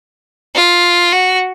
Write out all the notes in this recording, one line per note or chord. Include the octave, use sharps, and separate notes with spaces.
F4
F#4